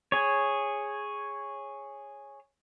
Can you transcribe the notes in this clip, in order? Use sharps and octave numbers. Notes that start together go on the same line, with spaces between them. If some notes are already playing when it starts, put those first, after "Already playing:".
G#4 C#5